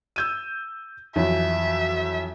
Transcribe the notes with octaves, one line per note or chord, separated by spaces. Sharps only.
E6 G6 D#7
F2 E3 F#3 E5